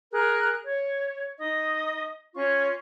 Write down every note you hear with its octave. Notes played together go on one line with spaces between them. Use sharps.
G#4 A#4 F#6
C#5
D#4 D#5 D#6
C#4 F4 C#5 C#6